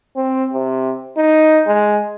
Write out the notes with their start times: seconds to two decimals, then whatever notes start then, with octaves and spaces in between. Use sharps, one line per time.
0.16 C4
0.53 C3
1.17 D#4
1.67 G#3